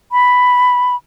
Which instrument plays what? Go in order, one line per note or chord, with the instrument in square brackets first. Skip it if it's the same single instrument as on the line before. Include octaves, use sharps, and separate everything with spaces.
[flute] B5